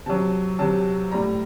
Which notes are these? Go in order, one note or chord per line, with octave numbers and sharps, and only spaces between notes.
C3 F#3 A5
C3 F#3 A5
A2 G3 A#5